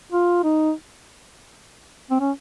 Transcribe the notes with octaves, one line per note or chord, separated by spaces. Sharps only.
F4
D#4
C4
C#4